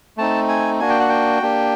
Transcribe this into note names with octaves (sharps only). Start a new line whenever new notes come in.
A3 C4 D#4 A5
G#5
A#3 D4 F#4 G#5
G5
F#5
G5
A#3 D4 G4